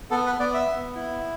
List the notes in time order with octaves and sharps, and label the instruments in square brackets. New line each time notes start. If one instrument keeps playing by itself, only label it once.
[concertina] B3 A4
B4
B3 D5
E5
B3
E4